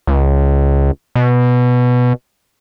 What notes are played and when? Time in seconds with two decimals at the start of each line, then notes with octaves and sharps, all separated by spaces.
0.07 C#2
1.15 B2